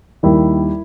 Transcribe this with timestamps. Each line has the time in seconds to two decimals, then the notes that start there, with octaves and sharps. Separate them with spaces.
0.23 D#2 D#3 G3 E4